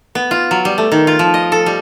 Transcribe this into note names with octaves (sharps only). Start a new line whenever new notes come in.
B3
F4
F#3
G3
A3
D#3
F4
F3
D#5
A4
G3